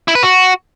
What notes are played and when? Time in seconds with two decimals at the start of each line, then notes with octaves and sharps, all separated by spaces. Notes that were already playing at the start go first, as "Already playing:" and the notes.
0.08 E4
0.15 B4
0.23 F#4